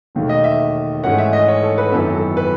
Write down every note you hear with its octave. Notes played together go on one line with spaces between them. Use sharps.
E1 D#2 D#3 A3
D#5
E5
G#2 E3 A3 C#4 F#5
E5
D#5
C#5
A4
B4
G#1 F#2 E3 B3 A4
A4
B4